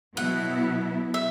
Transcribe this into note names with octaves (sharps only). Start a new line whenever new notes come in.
B2 F#3 B3 E4 F#5
E5